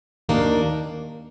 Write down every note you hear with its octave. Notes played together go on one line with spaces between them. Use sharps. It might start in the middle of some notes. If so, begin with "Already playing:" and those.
D#2 D#3 A#3 D4